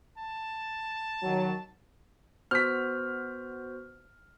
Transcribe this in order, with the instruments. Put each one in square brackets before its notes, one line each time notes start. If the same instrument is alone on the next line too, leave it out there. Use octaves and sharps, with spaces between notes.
[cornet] A5
[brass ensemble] D#3 F#3
[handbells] B3 F#4 C5 [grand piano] F6 B6